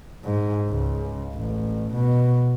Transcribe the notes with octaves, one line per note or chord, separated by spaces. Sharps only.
G#2
C#2
A1
B2